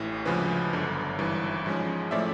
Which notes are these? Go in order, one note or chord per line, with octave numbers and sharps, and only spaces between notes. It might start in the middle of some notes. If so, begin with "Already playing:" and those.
Already playing: A1 A2 E3
D2 C#3 F3 G#3 C#4 B4
G1 F#2 D3
G#1 G2 E3
G#2 F3 G#3 C#4
A2 F3 A3 C#4 D5 E5